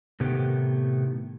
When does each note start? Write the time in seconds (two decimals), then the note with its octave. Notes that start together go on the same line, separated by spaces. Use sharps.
0.20 A2 C3 D#3 A3 B3 G4